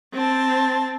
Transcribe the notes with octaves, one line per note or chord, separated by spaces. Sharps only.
C4 A5